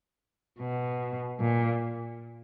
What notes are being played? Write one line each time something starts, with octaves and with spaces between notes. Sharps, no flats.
B2
A#2